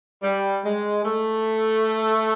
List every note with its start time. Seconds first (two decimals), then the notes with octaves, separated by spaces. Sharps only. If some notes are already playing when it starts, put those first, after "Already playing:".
0.23 G3
0.65 G#3
1.05 A3